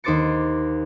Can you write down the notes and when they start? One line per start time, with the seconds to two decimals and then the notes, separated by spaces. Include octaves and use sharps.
0.04 D#2 D#4 C5 D6 A6 C#7